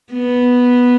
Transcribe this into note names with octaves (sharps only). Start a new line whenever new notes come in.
B3